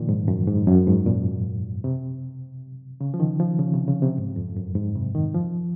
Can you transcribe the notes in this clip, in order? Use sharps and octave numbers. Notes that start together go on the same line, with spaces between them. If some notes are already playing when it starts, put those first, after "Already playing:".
Already playing: A#2 D#3 F3
G#2
F#2
G#2
F#2
G#2
A#2
C3
C#3
F3
D#3
F3
C#3
C3
C#3
C3
G#2
F2
F#2
G#2
C3
D#3
F3